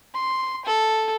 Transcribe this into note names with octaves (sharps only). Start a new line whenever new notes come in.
C6
A4